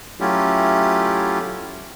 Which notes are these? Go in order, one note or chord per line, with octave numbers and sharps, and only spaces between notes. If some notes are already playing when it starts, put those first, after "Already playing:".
F#3 A3 C#4 E4 F4 G4